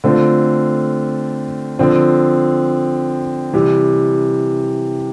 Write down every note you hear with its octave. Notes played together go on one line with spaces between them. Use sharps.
D3 A3 C4 F4
D3 F3 C4
C3 E3 G3